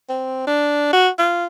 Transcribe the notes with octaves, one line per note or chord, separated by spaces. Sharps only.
C4
D4
F#4
F4